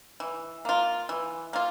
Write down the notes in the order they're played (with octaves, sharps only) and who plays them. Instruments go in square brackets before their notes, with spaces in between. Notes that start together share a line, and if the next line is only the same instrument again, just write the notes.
[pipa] E3
A#3 F4
E3
A#3 F4